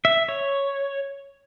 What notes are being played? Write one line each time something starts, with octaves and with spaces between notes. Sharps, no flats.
E5
C#5